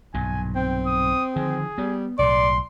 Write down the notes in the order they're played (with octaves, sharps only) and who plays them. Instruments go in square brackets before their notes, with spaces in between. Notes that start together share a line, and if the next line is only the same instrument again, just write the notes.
[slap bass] B1 G2 A#2 [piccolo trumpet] G#5
[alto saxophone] C4 [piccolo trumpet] G5
[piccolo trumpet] D#6
[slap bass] D3 D#3 F3 [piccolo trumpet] G#4
[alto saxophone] G3 [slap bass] B3
[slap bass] B1 A2 [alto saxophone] D5 [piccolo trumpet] C6